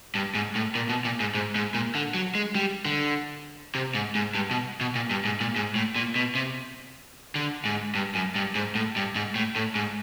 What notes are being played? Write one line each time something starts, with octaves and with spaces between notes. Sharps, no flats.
G2
G#2
A2
A#2
B2
A#2
G#2
G#2
G#2
A#2
D3
F#3
G#3
G3
D3
C3
G#2
G#2
G2
B2
B2
A#2
G2
G#2
A#2
G#2
A2
A#2
B2
C3
D3
G#2
G2
F#2
G2
G#2
A2
G2
G#2
A2
A2
G#2